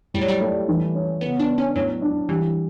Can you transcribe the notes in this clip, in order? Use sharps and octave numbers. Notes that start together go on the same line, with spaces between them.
A2 G3
F#3
G3
A3
E3
C#4
C#3 B3
D4
B3
C#4
A2 F#3
D4
E3 G3